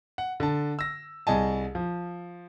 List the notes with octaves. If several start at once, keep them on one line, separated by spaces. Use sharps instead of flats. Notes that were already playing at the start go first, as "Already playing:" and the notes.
F#5
D3 A5
E6 A#6
C2 G#4 D#5 G#5 A5
F3